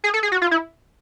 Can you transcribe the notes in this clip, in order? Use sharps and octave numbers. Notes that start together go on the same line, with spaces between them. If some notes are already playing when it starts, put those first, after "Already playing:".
G#4
A4
G#4
F#4
F4
E4